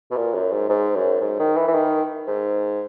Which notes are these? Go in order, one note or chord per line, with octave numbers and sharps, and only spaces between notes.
B2
A#2
F#2
G#2
G#2
F#2
G#2
D#3
E3
E3
D#3
G#2